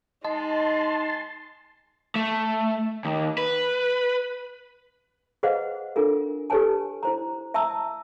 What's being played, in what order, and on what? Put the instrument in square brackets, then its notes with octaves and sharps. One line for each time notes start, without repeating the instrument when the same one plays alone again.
[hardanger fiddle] G#3 [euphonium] D#4 [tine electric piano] D#5 [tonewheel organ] A5 C6
[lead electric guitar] A3
D#2
B4
[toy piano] G#4 B4 C5 D#5 F5 F#5
D4 F4 A4 A#4
G4 A4 B4 C#5 G#5 A5
E4 C5 A#5
E5 A5 A#5 D#6 E6